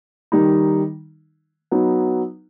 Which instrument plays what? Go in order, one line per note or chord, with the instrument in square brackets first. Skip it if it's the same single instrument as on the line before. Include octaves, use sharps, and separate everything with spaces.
[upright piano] D#3 G3 D#4
F#3 B3 D#4